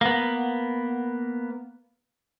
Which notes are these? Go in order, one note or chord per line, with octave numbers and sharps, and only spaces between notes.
A#3 B3